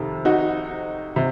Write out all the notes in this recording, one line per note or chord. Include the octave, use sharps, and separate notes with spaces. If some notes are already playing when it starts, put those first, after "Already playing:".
Already playing: F2 C3 D#3
D#4 F#4
C3